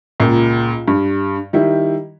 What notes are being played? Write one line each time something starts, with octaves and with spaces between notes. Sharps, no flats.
C#2 A#2
G2
D#3 G3 E4